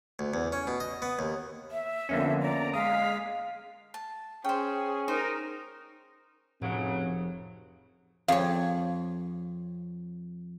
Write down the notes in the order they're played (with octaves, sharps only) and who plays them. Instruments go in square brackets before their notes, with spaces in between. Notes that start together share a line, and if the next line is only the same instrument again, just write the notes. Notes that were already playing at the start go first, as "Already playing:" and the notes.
[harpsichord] D2
E2
C#4
B2
D#5
B3
D#2
[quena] E5
[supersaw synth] F2 D3 [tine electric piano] A#3 B3 C#4
[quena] D5 [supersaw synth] A#5
[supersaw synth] G#3 B6 [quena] F5 [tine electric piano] D#6
[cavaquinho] A5
[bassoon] C#4 [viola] G#4 [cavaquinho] C5 G5
[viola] D#4 A#4 [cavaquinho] C5
[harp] F1 D7 [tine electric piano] A2 [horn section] C#3 F#3 [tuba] C4
[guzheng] F2 C#5 [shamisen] G#4 F5